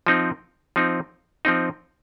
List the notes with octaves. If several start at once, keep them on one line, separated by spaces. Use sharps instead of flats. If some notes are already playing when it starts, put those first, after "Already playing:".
F3 C4 D#4
F3 C4 D#4
F3 C4 D#4